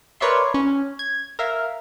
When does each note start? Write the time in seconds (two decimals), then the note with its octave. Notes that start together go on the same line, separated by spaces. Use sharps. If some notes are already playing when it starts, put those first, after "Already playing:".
0.20 A#4 B4 C#5 D5 E5 C6
0.54 C#4
0.99 G#6
1.39 A#4 E5 F5